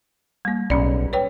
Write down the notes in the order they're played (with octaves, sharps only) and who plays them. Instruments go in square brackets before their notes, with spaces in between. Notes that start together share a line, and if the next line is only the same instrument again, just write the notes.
[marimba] G3 A#3
[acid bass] B1 [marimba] A2 C#4 D5
[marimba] B4 C#5 G5